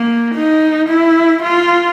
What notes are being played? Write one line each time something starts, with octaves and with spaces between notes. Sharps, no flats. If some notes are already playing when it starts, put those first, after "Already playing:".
Already playing: A#3
D#4
E4
F4